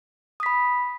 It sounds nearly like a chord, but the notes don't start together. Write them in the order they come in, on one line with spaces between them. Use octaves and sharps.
D#6 B6 B5